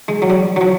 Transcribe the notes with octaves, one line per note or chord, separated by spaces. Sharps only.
G#3
F#3
G3
F#3
F3